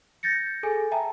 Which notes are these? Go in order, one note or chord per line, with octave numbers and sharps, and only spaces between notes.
G6 A6 A#6 C#7
G#4 A4 G#5
E5 G5 A5 A#5